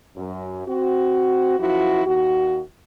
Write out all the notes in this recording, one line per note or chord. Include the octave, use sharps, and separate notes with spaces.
F#2
C4 F#4
F#2 F3 E4 F#4
D#2 F#4